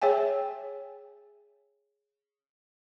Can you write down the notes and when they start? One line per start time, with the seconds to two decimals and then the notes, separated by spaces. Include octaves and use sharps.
0.02 G#4 C#5 E5 G5 G#5